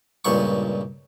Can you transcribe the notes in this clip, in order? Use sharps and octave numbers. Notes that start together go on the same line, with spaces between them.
C#2 G2 A#2 C#6